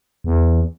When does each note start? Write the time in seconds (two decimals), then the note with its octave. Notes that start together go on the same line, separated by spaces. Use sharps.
0.24 E2